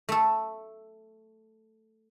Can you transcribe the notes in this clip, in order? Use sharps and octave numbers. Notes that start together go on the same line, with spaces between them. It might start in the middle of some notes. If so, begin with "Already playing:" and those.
A3 A4